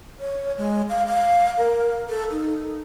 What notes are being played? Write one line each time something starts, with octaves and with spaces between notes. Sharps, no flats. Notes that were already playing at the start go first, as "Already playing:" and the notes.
C#5
G#3
F5
F5
A#4
A4
D#4